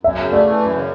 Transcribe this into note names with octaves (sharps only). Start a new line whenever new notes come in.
F#2 E5
C#3
A3 D5
E3
F#2
C#3